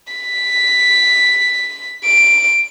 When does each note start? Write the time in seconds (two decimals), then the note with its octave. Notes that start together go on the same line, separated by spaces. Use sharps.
0.13 B6
2.05 D7